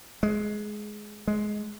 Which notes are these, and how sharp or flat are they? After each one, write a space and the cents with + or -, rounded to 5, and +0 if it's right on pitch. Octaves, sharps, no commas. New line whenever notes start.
G#3 +15
G#3 +15